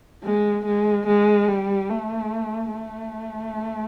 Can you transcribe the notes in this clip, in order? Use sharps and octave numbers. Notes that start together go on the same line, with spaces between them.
G#3
G#3
G#3
G3
A3
A3